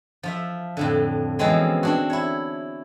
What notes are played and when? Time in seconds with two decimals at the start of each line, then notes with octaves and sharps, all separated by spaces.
0.23 F3 F4 E5
0.77 F2 A2 D3
1.39 B2 E3 F3 G#3 C4 C#4
1.83 C4 D4 F#4
2.10 E4 C#5